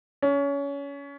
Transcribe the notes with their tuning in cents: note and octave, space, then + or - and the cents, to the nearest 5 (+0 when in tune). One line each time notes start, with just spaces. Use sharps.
C#4 +25